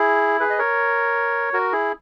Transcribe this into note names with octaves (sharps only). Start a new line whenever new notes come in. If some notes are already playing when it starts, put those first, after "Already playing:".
Already playing: E4 G#4
G#4 B4
D#5
A#4 C#5
F#4 A#4
E4 G#4